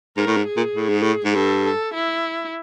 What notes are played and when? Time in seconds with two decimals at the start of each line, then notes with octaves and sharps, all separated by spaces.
0.17 G#2 A#4
0.27 A2
0.37 G#2
0.47 G#4
0.57 A#2
0.76 A2
0.89 G#2
1.03 A2
1.25 G#2
1.35 G2 A4
1.64 A4
1.94 E4